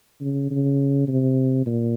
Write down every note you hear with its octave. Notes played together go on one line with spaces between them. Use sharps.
C#3
C#3
C3
A#2